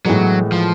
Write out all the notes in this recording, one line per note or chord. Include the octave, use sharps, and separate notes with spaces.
A2 E3 F#3 G#3 B3
F3